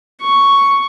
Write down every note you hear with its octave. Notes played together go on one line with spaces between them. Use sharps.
C#6